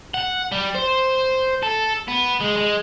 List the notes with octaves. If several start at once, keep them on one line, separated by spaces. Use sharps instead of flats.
F#5
G3
C5
A4
B3
G#3
G#3